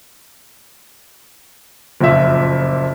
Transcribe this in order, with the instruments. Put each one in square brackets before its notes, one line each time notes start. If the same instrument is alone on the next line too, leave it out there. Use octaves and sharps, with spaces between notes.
[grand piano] F#1 F2 A#2 E5